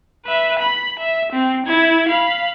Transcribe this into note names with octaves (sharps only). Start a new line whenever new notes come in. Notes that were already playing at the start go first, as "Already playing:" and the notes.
B4 E5
B5
E5
C4
E4 G#6
F5 B5